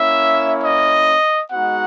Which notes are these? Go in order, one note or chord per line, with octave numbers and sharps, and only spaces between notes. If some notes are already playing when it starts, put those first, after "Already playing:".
Already playing: A#3 C#4 E4 E5
D#5
G#3 B3 D#4 F#4 F#5